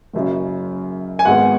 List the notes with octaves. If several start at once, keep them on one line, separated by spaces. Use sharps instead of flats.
F#1 F#2 C#3
G#5
G#1 G#2 G#3 B3 F#5